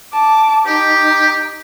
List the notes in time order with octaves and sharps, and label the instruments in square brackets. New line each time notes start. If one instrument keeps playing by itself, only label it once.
[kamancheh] A5 D6
[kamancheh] D#4 [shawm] G4